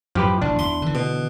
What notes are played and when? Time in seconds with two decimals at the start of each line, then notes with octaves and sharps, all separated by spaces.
0.15 F#2 A2 F3 G4 B4
0.41 A1 A#2 D4
0.59 E2 C6
0.82 D3 E3
0.95 B2